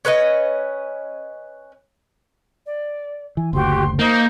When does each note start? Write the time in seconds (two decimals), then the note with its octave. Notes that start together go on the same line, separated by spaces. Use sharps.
0.05 C#4 B4 C#5 D#5
2.66 D5
3.37 E3 G#5
3.53 F#1 D2 F#4 G4 C6
3.99 A#3 D#4 C5 G6